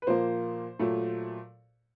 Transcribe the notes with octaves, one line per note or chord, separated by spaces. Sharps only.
B4
A#2 F3 A#3 C5
A#2 F#3 A3